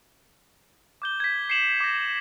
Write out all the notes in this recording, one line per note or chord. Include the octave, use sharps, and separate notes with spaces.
D6 G6 G7
G#6 B6
C7 C#7 E7 F#7 G7
D6 A#6